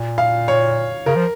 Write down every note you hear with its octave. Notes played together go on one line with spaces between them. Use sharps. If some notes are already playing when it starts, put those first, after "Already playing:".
Already playing: A#2
F5
C#5
C#3 A#4
F3